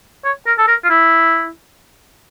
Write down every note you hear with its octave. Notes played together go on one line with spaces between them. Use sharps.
C#5
A#4
A4
A#4
F4
E4